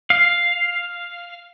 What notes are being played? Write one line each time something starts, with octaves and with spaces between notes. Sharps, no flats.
F5